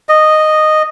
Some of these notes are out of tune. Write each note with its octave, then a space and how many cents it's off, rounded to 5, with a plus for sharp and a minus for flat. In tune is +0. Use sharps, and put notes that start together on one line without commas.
D#5 -10